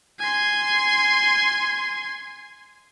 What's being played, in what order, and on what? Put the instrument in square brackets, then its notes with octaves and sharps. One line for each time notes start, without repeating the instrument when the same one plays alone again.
[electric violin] G#5 C6